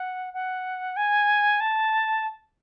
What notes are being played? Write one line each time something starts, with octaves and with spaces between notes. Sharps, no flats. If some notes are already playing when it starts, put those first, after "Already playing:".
Already playing: F#5
F#5
G#5
A5